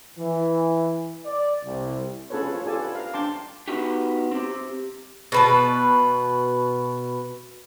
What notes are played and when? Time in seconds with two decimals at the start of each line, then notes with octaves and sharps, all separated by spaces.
0.18 E3
1.25 D5
1.64 C2
2.30 C#4 F4 G#4 A4 B4 C#5
2.50 F4 C#5
2.66 F4 G4 A4 D5 G#5 A5
2.79 B4
2.95 F5 A#5
3.14 D4 G5 A5 C6 D6
3.68 B3 D#4 F#4 G4
4.31 C4 G4
5.32 B2 B4 A5